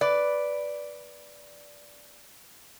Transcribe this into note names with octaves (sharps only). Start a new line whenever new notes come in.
B4 D5